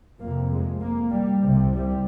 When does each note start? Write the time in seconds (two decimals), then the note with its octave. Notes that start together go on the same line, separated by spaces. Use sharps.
0.20 F2 C3 A#3
0.51 G#3
0.81 A#3
1.11 G3
1.42 C2 C3
1.72 G3